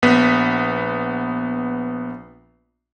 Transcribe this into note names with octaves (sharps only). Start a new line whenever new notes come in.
A#1 B3 B6